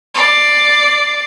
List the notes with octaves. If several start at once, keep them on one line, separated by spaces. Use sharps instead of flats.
D5 C7